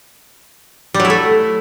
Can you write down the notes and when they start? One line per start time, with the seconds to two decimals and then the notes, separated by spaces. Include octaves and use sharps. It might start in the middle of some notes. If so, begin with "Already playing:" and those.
0.94 G3
1.00 F#3
1.05 E4
1.10 A3